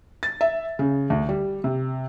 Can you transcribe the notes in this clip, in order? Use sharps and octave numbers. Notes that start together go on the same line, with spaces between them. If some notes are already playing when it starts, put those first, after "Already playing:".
A6
E5
C#3
D2
G3
C3